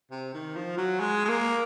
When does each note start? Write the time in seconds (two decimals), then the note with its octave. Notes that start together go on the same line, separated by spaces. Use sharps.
0.11 C3
0.34 D#3
0.56 F3
0.77 F#3
1.00 G#3
1.25 G#3
1.29 A#3